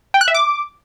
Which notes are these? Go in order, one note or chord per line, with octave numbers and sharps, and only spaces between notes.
G5
F#6
E5
D6